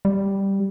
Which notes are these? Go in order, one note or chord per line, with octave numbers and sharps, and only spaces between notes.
G3